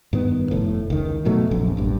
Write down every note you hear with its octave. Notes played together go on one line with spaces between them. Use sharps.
G2 D#3 B3
F1 A2
C#2 D#3
F#2 B2 F#3 A3
F1 A#1 F#2
A1 G2